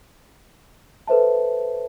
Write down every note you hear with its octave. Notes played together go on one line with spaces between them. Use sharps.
A4 B4 C5 E5 A5